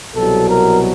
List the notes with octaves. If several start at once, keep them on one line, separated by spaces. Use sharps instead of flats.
C2 B2 F#3 A4
A#4